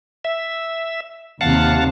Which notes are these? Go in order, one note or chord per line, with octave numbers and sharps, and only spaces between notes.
E5
D#2 C3 F5 F#5 A5